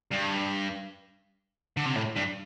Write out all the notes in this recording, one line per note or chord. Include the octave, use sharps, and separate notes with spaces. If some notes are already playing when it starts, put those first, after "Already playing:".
G2
D3
C3
A2
G2